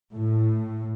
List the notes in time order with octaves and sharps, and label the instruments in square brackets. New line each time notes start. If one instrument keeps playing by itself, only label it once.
[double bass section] A2